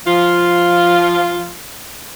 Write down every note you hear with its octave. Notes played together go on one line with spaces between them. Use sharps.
F3 F4